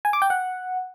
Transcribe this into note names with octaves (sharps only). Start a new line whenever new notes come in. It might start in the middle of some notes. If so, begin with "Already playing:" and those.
G#5
D6
G5
F#5